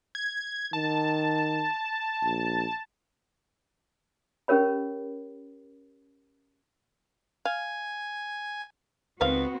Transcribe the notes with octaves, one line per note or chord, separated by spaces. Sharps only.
G#6
D#3 A5
A#1
C#4 G4 A#4 C#5 B5
F5 G#5 G#6
C#2 D#3 B3 C4 F#4 B4 C5 F5